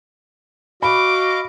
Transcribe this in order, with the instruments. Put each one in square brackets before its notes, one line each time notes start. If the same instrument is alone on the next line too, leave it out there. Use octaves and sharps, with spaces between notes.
[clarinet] F#4 [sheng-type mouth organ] D#5 F5 [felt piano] B5 [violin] D6